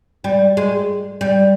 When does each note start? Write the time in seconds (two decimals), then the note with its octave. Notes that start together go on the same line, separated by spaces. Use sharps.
0.24 G3
0.57 G#3
1.21 G3